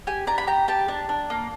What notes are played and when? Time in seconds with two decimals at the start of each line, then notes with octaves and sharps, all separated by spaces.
0.07 G4 G#5
0.27 D4 A#5
0.38 B5
0.47 G4 A#5
0.68 G4 A5
0.88 D4
1.09 D4
1.30 A#3